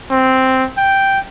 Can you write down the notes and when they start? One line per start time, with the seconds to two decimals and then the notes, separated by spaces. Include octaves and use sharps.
0.11 C4
0.77 G5